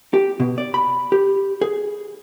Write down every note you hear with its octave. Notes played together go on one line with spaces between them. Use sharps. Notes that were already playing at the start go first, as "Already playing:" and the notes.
G4
B2
D5
B5
G4
G#4